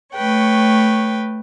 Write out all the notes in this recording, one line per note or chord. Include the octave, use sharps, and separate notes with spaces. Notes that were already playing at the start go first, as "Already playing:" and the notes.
A3 B4 C#5 G5